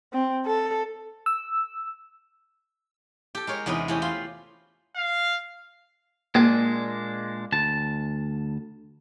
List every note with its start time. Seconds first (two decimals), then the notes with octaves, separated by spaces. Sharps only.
0.13 C4
0.46 A4
1.26 E6
3.35 G4 A4
3.47 G#3 A#4 C#5
3.66 E2 C3 C#4 D#4 B4 D#5
3.88 E3 A3 C#4 G4
4.02 F4 B5 C6
4.96 F5
6.35 A#2 G#3 A#3 D4
7.52 D2 A5